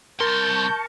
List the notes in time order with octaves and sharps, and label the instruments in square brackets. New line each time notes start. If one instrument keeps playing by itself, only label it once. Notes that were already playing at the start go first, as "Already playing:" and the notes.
[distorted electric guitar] C2 C6 [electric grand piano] A#4 [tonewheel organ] A5 C#6 [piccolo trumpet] G6